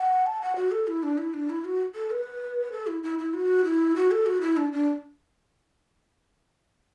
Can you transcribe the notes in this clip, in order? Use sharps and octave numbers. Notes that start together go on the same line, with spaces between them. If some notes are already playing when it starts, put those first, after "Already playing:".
Already playing: F#5
A5
F#5
F#4
A4
E4
D4
E4
D4
E4
F#4
A4
B4
A4
E4
E4
E4
F#4
E4
F#4
A4
F#4
E4
D4
D4